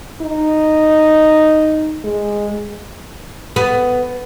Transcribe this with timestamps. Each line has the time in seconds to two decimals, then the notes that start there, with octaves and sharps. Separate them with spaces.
0.22 D#4
2.04 G#3
3.56 B3